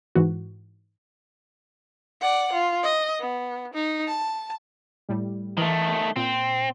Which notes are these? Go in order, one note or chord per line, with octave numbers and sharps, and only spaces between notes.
G#2 E3 F#4
D5 F#5
F4
D#5
B3
D#4
A5
A2 G3
D#3 E3 A3
A#2 C4